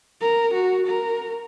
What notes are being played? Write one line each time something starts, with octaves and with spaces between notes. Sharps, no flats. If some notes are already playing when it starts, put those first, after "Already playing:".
A#4
F#4
A#4